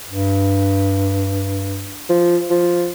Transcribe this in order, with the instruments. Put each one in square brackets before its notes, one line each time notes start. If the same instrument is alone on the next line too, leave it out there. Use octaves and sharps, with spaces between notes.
[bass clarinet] G2
[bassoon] F3
F3